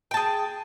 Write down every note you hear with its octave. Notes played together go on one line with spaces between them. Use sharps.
G#4 G5 A5